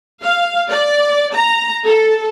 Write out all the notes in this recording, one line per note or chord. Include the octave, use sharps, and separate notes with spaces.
F5
D5
A#5
A4